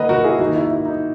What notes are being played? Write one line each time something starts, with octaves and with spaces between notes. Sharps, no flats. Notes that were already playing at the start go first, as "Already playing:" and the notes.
Already playing: D#3 A#3 B4 D#5 F#5
F#4 A#4
E4 G#4
D#3 A#3 D#4 F#4
E4
E4
D#4